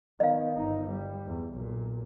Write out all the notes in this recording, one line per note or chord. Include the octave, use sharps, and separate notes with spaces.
D#3 B3 D#5 F5
G1 D#4
G3
E2
B1 A#2